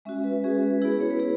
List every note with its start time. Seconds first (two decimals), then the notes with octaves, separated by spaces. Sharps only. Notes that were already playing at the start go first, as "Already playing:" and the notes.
0.05 G#3 C#4 F#4 E5
0.24 B4
0.44 G#3 C#4 F#4 G#4
0.63 B4
0.82 B3 E4 G#4
0.92 G#4
1.00 C#5
1.11 B4
1.19 B3 G#4